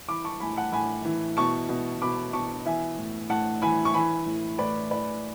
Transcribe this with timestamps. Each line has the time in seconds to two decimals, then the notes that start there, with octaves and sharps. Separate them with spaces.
0.09 E3 B5 D6
0.24 A5 C#6
0.40 A2 G#5 B5
0.56 F#5 A5
0.73 A2 G#5 B5
1.05 E3
1.37 B2 A5 C#6
1.69 B2
2.02 B2 B5 D6
2.33 B2 A5 C#6
2.66 E3 E5 G#5
2.98 A2
3.30 A2 F#5 A5
3.62 E3 G#5 B5
3.85 C#6
3.94 E3 G#5 B5
4.26 A2
4.58 A2 B4 D5
4.90 E3 B4 D5